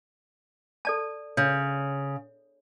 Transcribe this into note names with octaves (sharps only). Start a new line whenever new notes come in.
A4 D5 A5
C#3 C#5